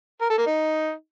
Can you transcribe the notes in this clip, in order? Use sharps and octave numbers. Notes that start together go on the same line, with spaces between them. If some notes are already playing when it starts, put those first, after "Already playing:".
A#4
A4
A#3
D#4